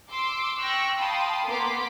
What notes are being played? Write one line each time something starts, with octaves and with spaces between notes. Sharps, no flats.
C6 D6 E6
G5 C#6 E6 F#6 A#6
F5 G5 A5 B5 C6 D#6
A#3 B3 A#5 C6 D6 B6